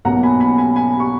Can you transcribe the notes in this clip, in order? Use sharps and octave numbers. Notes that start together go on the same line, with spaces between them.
B1 B2 A#3 C#4 F#5 A#5
G#5 B5
G#5 B5
G#5 B5
G#5 B5
C#6